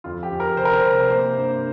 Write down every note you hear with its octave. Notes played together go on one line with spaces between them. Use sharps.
F2 F4
G4
F2
A#4
C3 C5
A#4
C5
C3
A#3 C5
G2